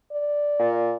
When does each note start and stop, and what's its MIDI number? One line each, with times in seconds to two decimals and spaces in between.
0.12 0.82 74
0.59 0.95 46